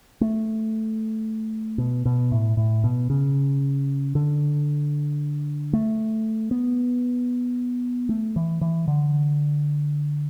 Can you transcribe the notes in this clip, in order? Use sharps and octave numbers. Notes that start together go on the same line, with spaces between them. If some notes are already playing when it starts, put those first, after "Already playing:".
A3
B2
B2
A2
A2
B2
C#3
D3
A3
B3
A3
E3
E3
D3